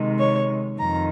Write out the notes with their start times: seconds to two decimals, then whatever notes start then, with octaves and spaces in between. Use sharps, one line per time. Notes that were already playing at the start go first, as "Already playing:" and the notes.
Already playing: C3 D#3 G#3
0.19 C#5
0.79 F2 D#3 A#5